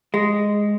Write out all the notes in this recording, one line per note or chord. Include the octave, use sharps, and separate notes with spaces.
G#3